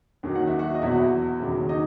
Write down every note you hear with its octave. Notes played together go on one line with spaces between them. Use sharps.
D#2 D#3 F#3
F#5
E5
F#4 F#5
D#5
E2 B2 F#3 E4 E5
F#4 F#5
E1 D#2 C#3 F#3
D#4 D#5